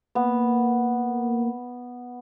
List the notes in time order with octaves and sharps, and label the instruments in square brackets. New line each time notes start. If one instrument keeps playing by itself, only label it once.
[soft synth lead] A#3 [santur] B3